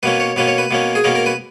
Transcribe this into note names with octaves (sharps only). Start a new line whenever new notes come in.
B2 A#3 C#4 B4
C#5
B2 A#3 C#4 B4
C#5
B4
B2 A#3 C#4
G#4
B2 A#3 C#4 A#4
A#4
B4